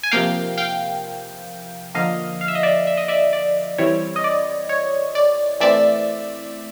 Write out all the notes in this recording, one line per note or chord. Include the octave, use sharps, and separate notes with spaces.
G#5
C3 F3 A#3 F5 G5
F5 G5
D3 F3 A#3 D#5 F5
F5
E5
D#5
D5 E5
E5
D#5
D5 E5
D5
E3 G3 C4 E4 C#5
D#5
D5
C#5
D5
E3 A3 C4 D5 E5